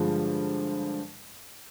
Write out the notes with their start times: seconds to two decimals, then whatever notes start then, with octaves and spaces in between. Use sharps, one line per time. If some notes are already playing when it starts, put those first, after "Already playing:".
Already playing: G2 D3 F3 G#3